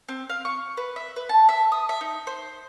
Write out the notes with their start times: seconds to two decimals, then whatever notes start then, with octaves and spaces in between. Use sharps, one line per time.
0.09 C4
0.30 F5
0.45 C#6
0.77 B4
0.96 E5
1.16 B4
1.29 A5
1.49 E5
1.72 D#6
1.89 E5
2.01 D#4
2.27 C5